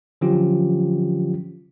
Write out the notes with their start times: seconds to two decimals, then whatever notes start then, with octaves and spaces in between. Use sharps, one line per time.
0.21 D3 F3 F#3 C#4 F4 G4